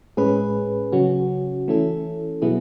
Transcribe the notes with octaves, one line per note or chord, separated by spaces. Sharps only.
A2 G#3 C#4 G#4 B4
C#3 F#3 C#4 F#4
E3 A3 C#4 E4 A4
B2 F#3 B3 E4 G#4